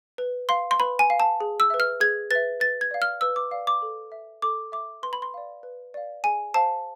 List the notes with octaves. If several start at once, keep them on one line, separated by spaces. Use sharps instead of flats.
B4
F5 C6
C6
B4 B5
G#5
F5
A5
G#4
E6
B4 E5
F6
G#4 G#6
B4 E5 A6
B4 A6
G#6
D5 F5
F6
B4 E6
D6
D5 F5
D6
A4
E5
A4 D6
E5 D6
B4 C6
B5
C6
D5 F5
B4
D5 F5
G#4 G#5
C5 F5 A5